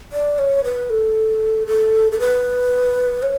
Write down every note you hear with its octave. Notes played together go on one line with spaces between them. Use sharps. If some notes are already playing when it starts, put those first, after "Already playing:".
D5
C#5
B4
A4
A4
A4
B4
C#5